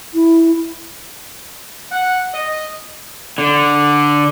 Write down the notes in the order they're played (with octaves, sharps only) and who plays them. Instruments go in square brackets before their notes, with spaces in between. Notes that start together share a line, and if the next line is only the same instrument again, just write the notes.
[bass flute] E4
[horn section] F#5
D#5
[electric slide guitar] D3